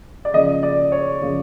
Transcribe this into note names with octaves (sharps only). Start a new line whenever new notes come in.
D5
C#3 F3 A#3 D#5
D5
C#5
C#3 F3 A#3